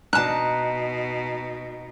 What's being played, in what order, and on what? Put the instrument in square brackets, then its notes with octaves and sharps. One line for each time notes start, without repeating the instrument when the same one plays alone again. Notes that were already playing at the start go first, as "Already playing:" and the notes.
[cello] B2 [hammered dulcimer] D#4 [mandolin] A5 F#6